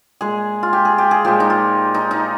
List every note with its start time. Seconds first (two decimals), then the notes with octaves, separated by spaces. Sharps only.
0.21 A#2 G#3 G#4
0.63 F4
0.73 G4
0.85 G#4
0.98 G4
1.11 G#4
1.25 A#2 F3 G#3 G4
1.40 D#4
1.50 F4
1.94 D#4
2.11 D#4